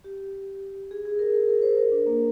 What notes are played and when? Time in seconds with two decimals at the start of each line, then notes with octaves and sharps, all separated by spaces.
0.04 G4
0.91 G#4
1.05 G#4
1.19 A#4
1.35 A#4
1.49 A#4
1.62 C5
1.78 A#4
1.92 D4
2.06 A#3